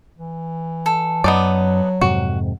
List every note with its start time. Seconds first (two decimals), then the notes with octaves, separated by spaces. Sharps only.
0.17 E3
0.86 A4
1.24 F#2 F#3 B3 D#4 D5
2.01 F2 G#2 C3 F#4